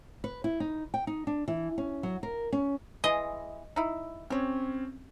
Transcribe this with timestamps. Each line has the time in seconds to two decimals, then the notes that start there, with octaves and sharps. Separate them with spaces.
0.24 B4
0.44 E4
0.60 D#4
0.94 G5
1.07 D#4
1.27 D4
1.48 E3
1.78 C#4
2.03 F#3
2.23 A#4
2.52 C#4
3.04 E3 G#3 D#5
3.76 D#4 E4
4.30 C4 C#4 G4 C#5